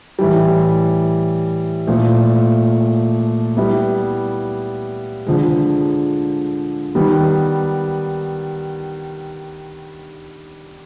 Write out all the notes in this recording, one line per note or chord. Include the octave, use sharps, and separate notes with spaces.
A2 E3 G3
A#2 F3 A3
G3 B3 E4
D3 F3 G#3
D#3 G3 B3